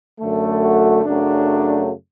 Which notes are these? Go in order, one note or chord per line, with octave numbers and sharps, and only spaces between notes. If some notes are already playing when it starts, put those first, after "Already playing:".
F#2 D3 A3
F#4
F#2 C#3 F#3 A3 D4